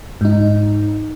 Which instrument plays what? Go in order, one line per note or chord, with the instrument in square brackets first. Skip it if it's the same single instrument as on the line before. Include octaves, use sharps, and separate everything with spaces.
[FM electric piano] G#2 D#4